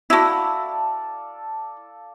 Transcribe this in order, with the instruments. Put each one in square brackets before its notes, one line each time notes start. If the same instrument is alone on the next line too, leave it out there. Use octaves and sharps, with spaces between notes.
[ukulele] E4 F#4 [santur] A4 D5 F5